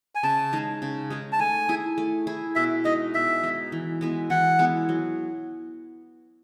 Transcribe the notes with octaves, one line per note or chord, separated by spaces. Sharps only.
G#5
C#3 A5
G#3 D#4 G#4
C#3
G#3 D#4 G#4
A5
A3 G#5
E4 G#4
A3
E4 G#4
B2 E5
G#3 D#4 D#5
B2 E5
G#3 D#4
E3
G#3 B3 E4
E3 F#5
G#3 B3 E4
F#3